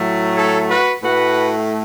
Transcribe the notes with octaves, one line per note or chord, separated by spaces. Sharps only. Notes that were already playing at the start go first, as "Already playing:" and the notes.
Already playing: A2 F#3 A3
A4 C#5
F#4 B4
A2 A3 F#4 B4